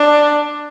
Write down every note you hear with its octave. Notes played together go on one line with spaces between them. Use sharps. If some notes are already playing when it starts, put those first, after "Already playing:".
Already playing: D4